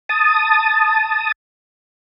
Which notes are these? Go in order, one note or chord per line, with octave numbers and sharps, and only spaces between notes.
A5 D#6